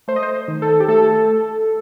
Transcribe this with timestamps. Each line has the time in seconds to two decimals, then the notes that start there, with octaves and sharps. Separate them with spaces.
0.08 A3 C5
0.16 D#5
0.23 C5
0.48 D#3
0.62 A4
0.80 G4
0.88 A3 A4